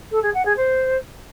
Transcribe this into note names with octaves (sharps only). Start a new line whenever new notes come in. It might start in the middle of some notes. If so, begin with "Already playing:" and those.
A4
G#4
F#5
G#4
C5